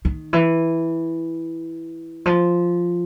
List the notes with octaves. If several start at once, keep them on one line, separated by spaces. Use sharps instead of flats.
D#3
E3
F3